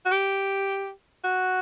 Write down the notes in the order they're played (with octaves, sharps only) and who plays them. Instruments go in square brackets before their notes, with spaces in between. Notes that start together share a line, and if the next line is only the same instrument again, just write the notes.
[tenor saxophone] F#4
G4
F#4